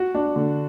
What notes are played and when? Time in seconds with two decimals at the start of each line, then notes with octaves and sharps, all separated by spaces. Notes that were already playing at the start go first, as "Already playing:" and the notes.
Already playing: F#4
0.15 D4
0.36 D3